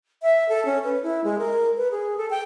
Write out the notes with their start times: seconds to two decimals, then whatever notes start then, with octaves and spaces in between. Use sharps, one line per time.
0.22 E5
0.49 A4
0.65 C#4
0.84 B4
1.03 E4
1.24 G#3
1.38 A#4
1.77 B4
1.91 G#4
2.17 A4
2.30 G5